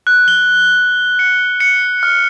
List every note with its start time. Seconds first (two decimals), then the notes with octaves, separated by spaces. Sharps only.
0.07 F#6
0.28 G7
1.19 C#7
1.60 C#7
2.03 F6